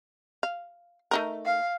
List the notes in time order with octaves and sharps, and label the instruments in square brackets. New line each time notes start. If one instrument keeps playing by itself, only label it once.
[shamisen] F5
A3 D#4 A#4
[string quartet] F5